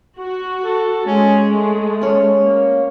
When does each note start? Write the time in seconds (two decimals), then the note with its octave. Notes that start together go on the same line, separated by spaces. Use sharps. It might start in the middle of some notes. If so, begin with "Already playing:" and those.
0.17 F#4
0.64 A4
1.06 G#3 C#4
1.49 A3
2.01 C#4 C#5
2.43 A#3